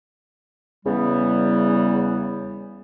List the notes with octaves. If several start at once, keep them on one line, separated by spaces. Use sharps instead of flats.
E2 C#3 G3 B3